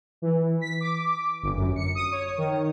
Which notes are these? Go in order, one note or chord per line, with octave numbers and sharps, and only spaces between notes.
E3
B6
D6
G1
F#2
C#7
D#6
C#5
D#3